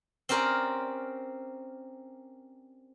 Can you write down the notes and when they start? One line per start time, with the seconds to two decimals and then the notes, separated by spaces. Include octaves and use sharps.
0.29 C4 C#4 G4 A#4 D5